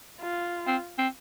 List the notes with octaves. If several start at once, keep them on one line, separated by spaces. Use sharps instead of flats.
F4
C4
C4